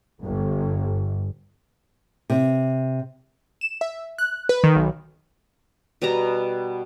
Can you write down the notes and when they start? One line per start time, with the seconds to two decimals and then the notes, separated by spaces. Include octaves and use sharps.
0.23 G1
2.30 C3
3.61 E7
3.81 E5
4.18 F#6
4.49 B4
4.64 D#3
4.75 B1
6.02 B2 G3 B3 A#5